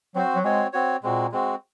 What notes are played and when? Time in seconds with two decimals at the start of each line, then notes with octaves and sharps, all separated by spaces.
0.15 F#3 C4 F#4 C5
0.35 F#3
0.44 G#3 C4 F#4 C#5
0.73 C4 F#4 C#5
1.03 A#2 G#3 C4 F#4
1.32 G#3 C4 F#4